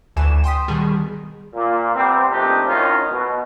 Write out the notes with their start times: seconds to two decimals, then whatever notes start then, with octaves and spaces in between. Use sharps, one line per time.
0.16 D2 E3 G#5 E7
0.44 G5 C6 D#6 B6
0.68 B2 D#3 G3 G#4
1.55 A#2
1.94 C3 G3 B3 C4
2.31 A#1 A3 C4 D4 D#4 G4
2.66 F#2 A2 D#3 C#4 D#4 F4
3.11 B2